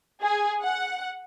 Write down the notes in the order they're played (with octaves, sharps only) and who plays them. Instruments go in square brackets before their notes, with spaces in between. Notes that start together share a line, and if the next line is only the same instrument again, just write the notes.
[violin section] G#4
F#5